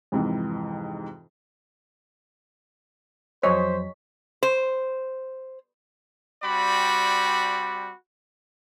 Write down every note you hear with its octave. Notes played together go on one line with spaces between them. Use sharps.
F2 G#2 C3 E3
F2 F#3 C5 C#5 D#5 B6
C5
G3 C4 F#4 D5 B5